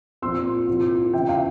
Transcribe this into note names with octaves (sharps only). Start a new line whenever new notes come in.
A#2 F3 C4 C6 E6
C2 A#2 F3
E2 C#3 F3 E5 G5
F5